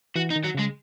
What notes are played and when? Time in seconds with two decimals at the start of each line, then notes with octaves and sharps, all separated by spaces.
0.16 E3 F#4
0.30 D#4
0.36 D#3
0.44 F#3
0.55 C#3 G#3